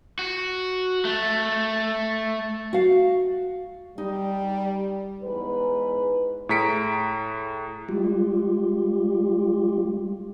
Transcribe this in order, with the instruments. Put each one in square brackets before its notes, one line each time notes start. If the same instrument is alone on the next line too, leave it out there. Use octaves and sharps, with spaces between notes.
[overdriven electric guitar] F#4
A3
[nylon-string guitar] F#4 F5
[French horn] G3 [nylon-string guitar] D#4
[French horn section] E2 G#2 B4
[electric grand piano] A2 G#4 A#5 B6 C#7 D7
[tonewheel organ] G3 G#3 F4 G4